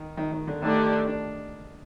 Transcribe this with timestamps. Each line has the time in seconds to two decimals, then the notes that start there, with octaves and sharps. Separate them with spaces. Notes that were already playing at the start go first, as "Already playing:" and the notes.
Already playing: D#3
0.17 D#3
0.32 D#3
0.47 D3
0.62 D3 D#3 A3 D4 G4 D5
1.07 D4